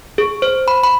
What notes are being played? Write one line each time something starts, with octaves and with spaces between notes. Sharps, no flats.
G#4
C5
B5
B5